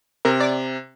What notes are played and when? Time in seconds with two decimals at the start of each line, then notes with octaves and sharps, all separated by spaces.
0.25 C3 A#4
0.40 D5